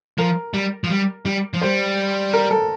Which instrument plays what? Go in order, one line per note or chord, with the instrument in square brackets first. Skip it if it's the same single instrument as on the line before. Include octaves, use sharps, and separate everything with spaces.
[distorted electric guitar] F3 [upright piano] A#4
[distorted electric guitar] G3
F3
G3
G3
F3
[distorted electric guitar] G3 [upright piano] C5
[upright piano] A#4
A4